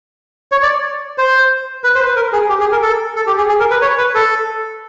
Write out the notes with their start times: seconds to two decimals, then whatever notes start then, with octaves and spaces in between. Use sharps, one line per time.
0.52 C#5
0.62 D5
1.18 C5
1.84 B4
1.95 C5
2.05 B4
2.16 A#4
2.33 G#4
2.49 G4
2.60 G#4
2.72 A#4
2.82 A4
3.16 A4
3.27 G4
3.37 G#4
3.49 G#4
3.60 A#4
3.70 B4
3.82 C#5
3.98 B4
4.15 A4